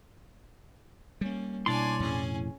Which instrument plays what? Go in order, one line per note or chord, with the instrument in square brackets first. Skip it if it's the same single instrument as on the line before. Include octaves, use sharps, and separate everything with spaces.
[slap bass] G3 A#3 [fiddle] C#4
[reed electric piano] B2 E4 [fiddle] D4 G#5 [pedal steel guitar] C#5 D5 C6
[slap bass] F2 A2 [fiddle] C#4 G#4